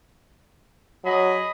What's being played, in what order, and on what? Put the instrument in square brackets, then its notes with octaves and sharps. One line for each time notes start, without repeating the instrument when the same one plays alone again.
[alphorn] F#3 [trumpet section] G#4 D#5 B5